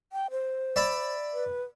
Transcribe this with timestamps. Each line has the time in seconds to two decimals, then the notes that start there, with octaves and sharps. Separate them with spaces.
0.12 G5
0.31 C5
0.76 D5 E5 B5
1.33 B4